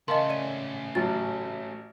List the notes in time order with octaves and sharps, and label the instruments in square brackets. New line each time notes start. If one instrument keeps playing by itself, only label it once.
[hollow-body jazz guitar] C#3 A#4 A5 [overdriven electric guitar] A3 C#4 [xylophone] D#5 F5 C6
[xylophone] D5 D#7
[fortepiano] A1 F#3 [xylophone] A6